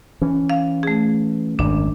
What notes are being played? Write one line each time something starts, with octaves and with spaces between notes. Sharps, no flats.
E3 C#4
F5
A3 G#4
G#1 F#2 D4